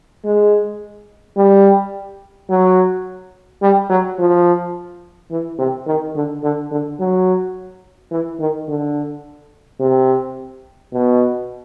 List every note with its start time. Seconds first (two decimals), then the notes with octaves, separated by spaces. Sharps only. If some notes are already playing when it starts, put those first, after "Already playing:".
0.25 G#3
1.37 G3
2.50 F#3
3.62 G3
3.89 F#3
4.18 F3
5.31 E3
5.59 C3
5.86 D#3
6.15 D3
6.43 D3
6.71 D3
6.99 F#3
8.11 E3
8.40 D#3
8.68 D3
9.80 C3
10.92 B2